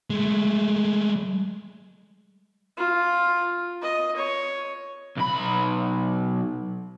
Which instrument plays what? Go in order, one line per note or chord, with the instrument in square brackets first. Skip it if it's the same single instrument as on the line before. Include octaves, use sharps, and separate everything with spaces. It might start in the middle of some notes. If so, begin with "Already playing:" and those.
[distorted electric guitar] G#3 A3
[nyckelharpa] F4
D#5
C#5
[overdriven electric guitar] B1 B5